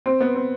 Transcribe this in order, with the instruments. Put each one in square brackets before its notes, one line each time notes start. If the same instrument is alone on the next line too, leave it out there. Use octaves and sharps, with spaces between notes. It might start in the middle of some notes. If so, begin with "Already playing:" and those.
[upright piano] C4
B3
C4